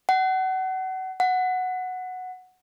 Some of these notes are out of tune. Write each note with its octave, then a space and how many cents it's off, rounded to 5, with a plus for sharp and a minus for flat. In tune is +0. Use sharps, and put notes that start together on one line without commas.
F#5 +30
F#5 -5